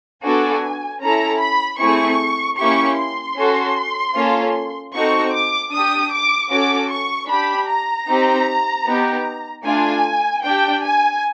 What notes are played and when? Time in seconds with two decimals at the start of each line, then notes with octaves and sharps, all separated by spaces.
0.23 B3 D4 F#4 A4 G#5
1.01 C#4 E4 A4 A#5
1.40 B5
1.80 A3 C4 E4 G#4 C#6
2.58 A#3 C#4 E4 G4 C#6
2.97 C6
3.36 C#4 F#4 A4
4.15 A#3 C#4 F4 A4
4.93 C4 D#4 F#4 A4 C#6
5.32 D6
5.72 D4 G4 D#6
6.12 D6
6.50 C#4 F#4 A4 D6
6.90 C#6
7.29 D4 G4 B5
7.69 A#5
8.08 C4 D#4 G4
8.85 B3 D#4 G4
9.64 A3 D4 F4 G#5
10.43 D4 G4 G5
10.83 G#5